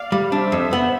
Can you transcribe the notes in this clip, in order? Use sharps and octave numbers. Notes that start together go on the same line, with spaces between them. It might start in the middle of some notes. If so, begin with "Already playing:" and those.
Already playing: D5 F5
G3
D4 C5 E5
F2
B3